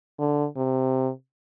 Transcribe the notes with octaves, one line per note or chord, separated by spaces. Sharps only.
D3
C3